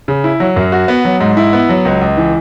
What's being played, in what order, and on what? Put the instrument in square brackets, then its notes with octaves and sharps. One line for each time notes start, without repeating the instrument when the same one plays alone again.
[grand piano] C#3
E4
F#3
F#2
F#4
B3
F#3
G#2
E4
B3
F#3
C#2
C#2
E3